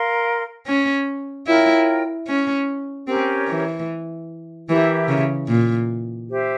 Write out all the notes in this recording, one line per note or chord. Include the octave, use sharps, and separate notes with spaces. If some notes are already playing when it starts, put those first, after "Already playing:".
Already playing: A#4 F5 C6
C#4
E4 F4 A#4 C#5 G5
C#4
C4 C#4 G4 A#4 C#5
E3
E3 E4 G4 A#4 E5
C#3
A#2
G4 C5 E5